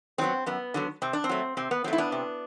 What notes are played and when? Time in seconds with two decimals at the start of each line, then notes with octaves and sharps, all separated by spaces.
0.18 D3 C4
0.21 F#3 B3
0.46 F#2 B3
0.74 D3 F#3 B3
1.02 C3 C4
1.13 D4
1.24 C4
1.29 F#3 A3
1.57 C3 C4
1.71 B3
1.84 F#3 C4
1.88 A3
1.93 E4
1.98 B3 D4
2.12 C3